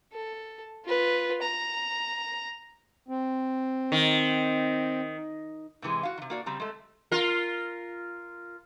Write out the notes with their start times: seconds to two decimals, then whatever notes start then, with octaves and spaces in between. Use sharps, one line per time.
0.13 A4
0.86 F4 B4
1.42 A#5
3.08 C4
3.92 D#3
5.82 G#2 C3 E3 G#3
6.03 F#4 F5
6.18 C3 D#3
6.30 A#3 F#4 D5
6.46 C#3 G3 C4 A#5
6.60 G#3 A3
7.12 F4 A#4